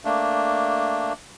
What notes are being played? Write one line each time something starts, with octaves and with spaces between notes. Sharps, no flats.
A3 A#3 D4